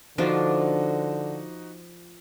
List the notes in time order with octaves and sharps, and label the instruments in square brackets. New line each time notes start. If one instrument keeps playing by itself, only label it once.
[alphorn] D3 [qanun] F3 D4 F4 [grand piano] D#4 F#4